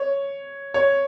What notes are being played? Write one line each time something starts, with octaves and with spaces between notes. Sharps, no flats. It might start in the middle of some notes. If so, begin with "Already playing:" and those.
Already playing: C#5
C#5